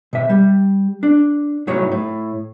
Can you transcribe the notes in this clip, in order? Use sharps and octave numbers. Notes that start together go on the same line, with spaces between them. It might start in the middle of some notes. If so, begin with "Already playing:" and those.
B2 E5
G3
D4
C2 A2 F#3 D#4 C#5
A2